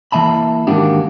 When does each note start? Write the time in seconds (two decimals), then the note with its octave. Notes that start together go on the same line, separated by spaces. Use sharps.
0.12 E3 A#3 E5 A5 B5
0.67 G#2 D#3 A#3 D4 F#4 G4